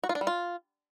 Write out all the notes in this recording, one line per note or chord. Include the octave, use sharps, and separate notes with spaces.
F#4
F4
D4
G3
F4